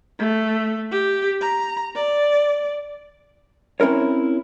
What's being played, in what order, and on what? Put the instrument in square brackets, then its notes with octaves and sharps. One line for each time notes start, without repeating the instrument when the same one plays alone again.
[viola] A3
G4
A#5
D5
[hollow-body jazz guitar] C4 C#4 E4 A#4 C#5